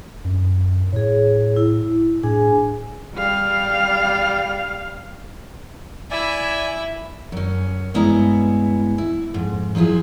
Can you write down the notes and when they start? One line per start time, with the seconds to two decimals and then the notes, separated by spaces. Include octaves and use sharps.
0.25 F#2
0.93 A2 G#4 C#5
1.56 E4
2.23 A2 D4 G#4 G#5
3.15 G3 F5
6.11 E4 D5 E5 G#5
7.32 F#2 C#4
7.94 G2 G#3 B3 C#4 E4 A#5
8.98 E4
9.34 F2 G#2
9.75 F3 F#3 E4 F4 G#4